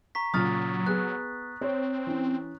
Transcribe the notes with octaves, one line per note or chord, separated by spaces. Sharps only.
A#5 C#6 B6
A#2 C#3 F#3 D#6 F6 A6
B3 G#4 F#6
C4 C#5
E3 C#4